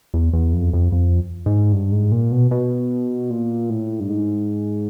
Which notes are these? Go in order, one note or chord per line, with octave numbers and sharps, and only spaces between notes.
E2
E2
F2
F2
F2
G#2
G2
G#2
A#2
B2
B2
A#2
A2
G2
G#2